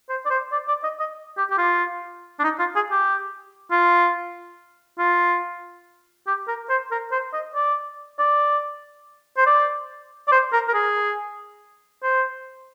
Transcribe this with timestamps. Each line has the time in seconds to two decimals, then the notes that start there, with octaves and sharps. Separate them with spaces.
0.09 C5
0.26 D5
0.30 C5
0.52 D5
0.68 D5
0.84 D#5
1.00 D#5
1.37 G4
1.51 G4
1.58 F4
2.39 D4
2.44 D#4
2.59 F4
2.76 G#4
2.91 G4
3.71 F4
4.99 F4
6.27 G4
6.48 A#4
6.70 C5
6.91 A#4
7.12 C5
7.33 D#5
7.55 D5
8.19 D5
9.37 C5
9.47 D5
10.28 D5
10.32 C5
10.53 A#4
10.68 A#4
10.74 G#4
12.03 C5